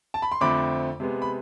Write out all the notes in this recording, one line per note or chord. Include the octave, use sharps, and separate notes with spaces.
A5
B5
C6
F2 D3 A3 C4 B5 D6
C3 G#3 B3
B5